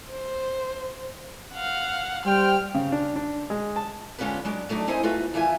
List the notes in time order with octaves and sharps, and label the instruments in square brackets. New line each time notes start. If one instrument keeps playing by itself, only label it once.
[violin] C5
F5 F#5
[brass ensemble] G3 C5 G5 [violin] F6
[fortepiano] C#3
D4
D4
G#3
A5
[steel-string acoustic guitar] D3 G#3 C#4 F4 G4 B4
F#3 G#3 D4
F#3 A3 D4 D#4
C4 D#4 E4 C5 D#5 G#5
A3 F4 F#4 B4
F2 E3 E4 F4 E5 G#5